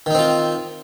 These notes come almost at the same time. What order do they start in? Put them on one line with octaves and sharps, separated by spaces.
D#3 D#4 C4 F4